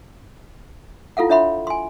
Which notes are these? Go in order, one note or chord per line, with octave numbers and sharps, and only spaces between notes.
E4 F4 A4 F5 F#5
D4 C#5 E5 F#5 B5 C6
G#5 C6